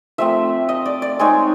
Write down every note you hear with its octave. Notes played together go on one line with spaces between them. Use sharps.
F3 A3 C4 E5
D#5
D5
D5
G#3 C4 D#4 C#5